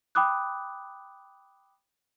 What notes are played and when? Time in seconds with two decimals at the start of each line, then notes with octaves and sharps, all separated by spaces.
0.15 G5 B5 D6 D#6 F#6